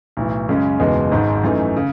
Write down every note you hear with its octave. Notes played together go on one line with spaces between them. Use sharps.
B1 A2 E3
F#2 C#3 G#3 C#4
F#1 E2 B2 G#3 D#4
G#1 G#2 D#3 G#3
F#2 E3 A3 D#4
C#3